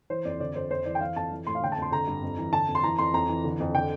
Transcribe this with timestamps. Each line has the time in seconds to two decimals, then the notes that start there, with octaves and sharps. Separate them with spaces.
0.10 E3 C5
0.25 F2 D5
0.40 D3 D5
0.55 F2 C5
0.71 F2 C5
0.86 E3 D5
0.95 G5
1.01 E3 F5
1.16 F2 A5
1.31 E3
1.47 A2 C6
1.55 F5
1.62 D3 G5
1.72 A5
1.77 F2
1.82 C6
1.92 D3 A#5
2.07 G2
2.23 F2
2.38 E3
2.53 D3 A5
2.68 F2
2.75 C6
2.83 E3 A#5
2.99 F2 C6
3.14 F2 A#5
3.29 E3
3.44 D3
3.60 F2
3.75 D3 G5